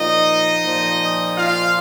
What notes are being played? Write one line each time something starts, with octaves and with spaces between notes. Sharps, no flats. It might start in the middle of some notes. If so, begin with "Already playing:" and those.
Already playing: A#2 F3 D#4 D#5
A#2 F3
F4 F5